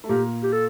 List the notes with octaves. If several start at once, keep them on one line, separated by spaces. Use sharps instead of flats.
A3
A#2 A#3 G4
G4
A4